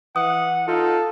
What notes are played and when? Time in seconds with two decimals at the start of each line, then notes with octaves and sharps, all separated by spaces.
0.16 E3 F#5 D#6
0.68 D#4 F4 A4